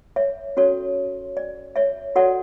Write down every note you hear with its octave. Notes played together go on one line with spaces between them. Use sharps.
C#5 E5
C#4 F#4 A4 C#5
D5
C#5 E5
F#4 A4 C#5 D5 F#5